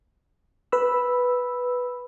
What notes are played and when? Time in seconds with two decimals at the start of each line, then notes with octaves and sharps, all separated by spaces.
0.72 B4 B5 E6